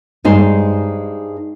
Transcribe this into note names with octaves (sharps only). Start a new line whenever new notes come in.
G2 G#3 D#4 C5